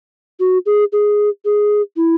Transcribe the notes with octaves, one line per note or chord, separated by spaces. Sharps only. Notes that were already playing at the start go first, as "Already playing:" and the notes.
F#4
G#4
G#4
G#4
E4